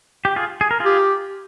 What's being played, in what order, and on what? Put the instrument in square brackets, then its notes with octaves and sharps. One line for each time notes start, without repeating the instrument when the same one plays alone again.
[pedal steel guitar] G4
F4 G#4
G#4
A#4
[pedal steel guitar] F4 G#4 [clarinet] G4